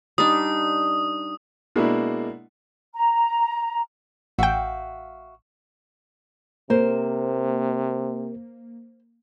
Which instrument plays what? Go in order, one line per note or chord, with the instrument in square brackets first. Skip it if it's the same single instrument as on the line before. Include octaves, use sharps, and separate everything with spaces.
[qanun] G3 D4 D#4 [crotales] D#6
[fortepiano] B2 G#3 A#3 D4 E4
[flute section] A#5
[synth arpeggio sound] A1 G5 [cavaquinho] F#4 E5 F5
[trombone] C3 [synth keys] A#3 [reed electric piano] A#4 [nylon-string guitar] C5